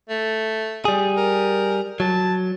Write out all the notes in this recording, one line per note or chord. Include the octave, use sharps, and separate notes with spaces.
A3
G3 G#4
A#4
F#3 A5